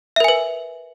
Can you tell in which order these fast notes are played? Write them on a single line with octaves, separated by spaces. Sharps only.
E5 A#4 G#5 B4